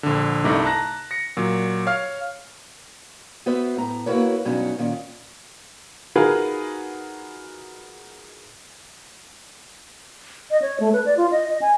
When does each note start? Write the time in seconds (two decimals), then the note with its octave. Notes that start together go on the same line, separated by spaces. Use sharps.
0.03 A#1 D3
0.44 C2 G2 A3 D#4 D6
0.65 A5 A#5 F#6 A#6
1.11 A#6 C#7
1.37 A#2 F#3
1.86 C#5 F5 F6
3.46 B3 F#4 B4 C5 E5
3.77 A2 A#5
4.06 A#3 E4 F#4 A#4 B4 C#5
4.45 G2 B2 F#3 C#4 D#4 F#4
4.79 A#2 D#3 C#4
6.16 D#4 F4 F#4 G#4 A#4 B4
10.51 D#5
10.62 C#5
10.80 A3
10.93 B4
11.06 D5
11.17 F4
11.31 D#5
11.49 D#5
11.61 G#5